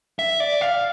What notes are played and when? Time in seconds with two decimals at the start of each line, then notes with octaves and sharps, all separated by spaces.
0.19 E5
0.40 D5
0.61 F5